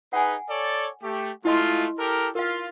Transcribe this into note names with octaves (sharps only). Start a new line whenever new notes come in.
D#4 G#4 B4 F#5 G#5
A4 C#5 D5
A3 G4
G#3 A3 E4 F4 D#5 C6
G4 A4 A#4
F4 A#4 F5